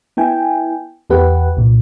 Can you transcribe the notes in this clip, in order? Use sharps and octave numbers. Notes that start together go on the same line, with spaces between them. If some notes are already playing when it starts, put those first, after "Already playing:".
B3 E4 G5 G#5
E2 B3 G4 B4 F#5
C2 A#2